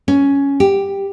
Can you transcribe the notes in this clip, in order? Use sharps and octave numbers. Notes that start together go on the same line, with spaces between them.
C#4
G4